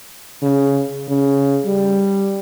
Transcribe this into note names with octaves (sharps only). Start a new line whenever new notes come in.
C#3
C#3
G3